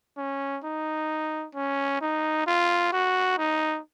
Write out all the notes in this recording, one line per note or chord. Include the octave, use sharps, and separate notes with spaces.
C#4
D#4
C#4
D#4
F4
F#4
D#4